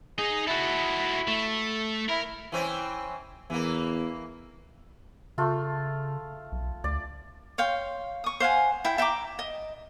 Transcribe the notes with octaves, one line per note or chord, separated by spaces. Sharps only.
D#4 G#4 D#5
E4 F#4 A4
A3
E4 A#4
E3 C4 C#4
E2 E3 A#3
C#3 A3 F4
B1
D2 D5
C#5 F5 G5 C6
C#6 D#6
C5 F5 F#5 G#5
E4 G5
E5 G5 A#5 D6
D#5